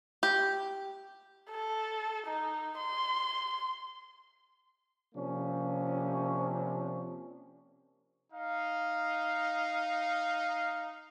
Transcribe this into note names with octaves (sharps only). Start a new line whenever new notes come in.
G4
A4
D#4
C6
C3 F3 A#3 C#4 D4
D#4 F5